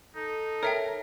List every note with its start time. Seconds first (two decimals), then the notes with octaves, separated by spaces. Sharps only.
0.15 D#4 A4
0.63 A#4 C#5 E5 G5